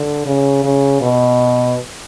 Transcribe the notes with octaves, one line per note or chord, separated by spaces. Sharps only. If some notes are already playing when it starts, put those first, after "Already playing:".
Already playing: D3
C#3
C#3
B2